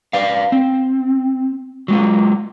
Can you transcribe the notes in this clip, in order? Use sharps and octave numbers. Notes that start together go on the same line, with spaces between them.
B4 D5 F5
C4
F#3 G#3 F4